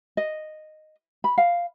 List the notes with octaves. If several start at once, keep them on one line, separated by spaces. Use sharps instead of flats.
D#5
B5
F5